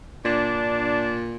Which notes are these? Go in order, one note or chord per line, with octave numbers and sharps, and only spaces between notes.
A#2 D4